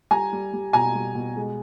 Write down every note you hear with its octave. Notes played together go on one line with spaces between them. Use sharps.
G3 G#5 A#5
G3
G3
B2 G#5 A#5
G3
B2
G#3